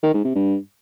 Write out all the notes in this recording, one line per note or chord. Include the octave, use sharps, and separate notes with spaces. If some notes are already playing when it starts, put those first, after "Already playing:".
D#3
G#2
C3
G2